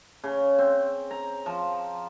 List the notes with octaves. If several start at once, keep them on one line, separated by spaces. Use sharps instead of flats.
C#3
C4
A#5
F3